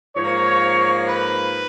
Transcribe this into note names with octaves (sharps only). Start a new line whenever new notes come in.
G#2 F3 A#3 C#5
B4